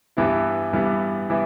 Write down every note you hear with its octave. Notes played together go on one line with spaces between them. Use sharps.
G2 E3 G3 B3 E4
G2 E3 G3 B3 E4
E3 G3 B3 E4